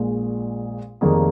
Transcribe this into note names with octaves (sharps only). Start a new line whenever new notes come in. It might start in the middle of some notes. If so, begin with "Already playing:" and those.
Already playing: A#1 A#2 G#3
F1 F2 D#3 A#3 G#4